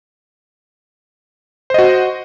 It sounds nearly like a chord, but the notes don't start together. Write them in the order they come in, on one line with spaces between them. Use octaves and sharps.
C5 D#5 F#4